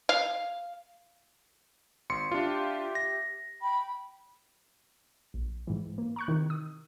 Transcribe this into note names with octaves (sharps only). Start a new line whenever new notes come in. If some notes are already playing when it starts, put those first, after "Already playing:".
F5
G#1 C6 C#7
D4 F4 G4 E5
A#6
G5 B5
A#1
G#2 E3
A#3
A#5 C#6 F#6
C3 D#3 E3
D#6